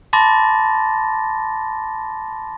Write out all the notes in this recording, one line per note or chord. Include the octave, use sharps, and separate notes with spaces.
A5 B5 C6 D6 A6 A#6